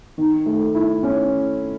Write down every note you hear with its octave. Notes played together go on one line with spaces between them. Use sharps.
D#3
A3
E4
C#4